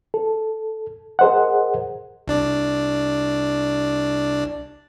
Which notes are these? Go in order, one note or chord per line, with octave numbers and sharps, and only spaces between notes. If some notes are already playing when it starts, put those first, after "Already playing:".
A4
G#4 A#4 C5 D#5 F#5
C2 D4 D5